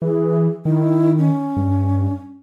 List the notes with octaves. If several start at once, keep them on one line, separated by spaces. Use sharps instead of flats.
E3 G#4
D#3 E4
C#4
G2